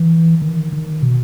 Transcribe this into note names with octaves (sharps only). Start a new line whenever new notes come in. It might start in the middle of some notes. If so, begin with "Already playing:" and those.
Already playing: E3
D#3
D#3
B2